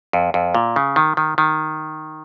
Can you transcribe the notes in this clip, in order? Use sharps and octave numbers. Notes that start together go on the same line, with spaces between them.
F2
F2
A#2
C#3
D#3
D#3
D#3